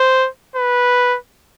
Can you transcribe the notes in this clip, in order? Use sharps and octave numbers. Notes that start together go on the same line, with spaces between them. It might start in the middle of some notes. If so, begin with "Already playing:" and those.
Already playing: C5
B4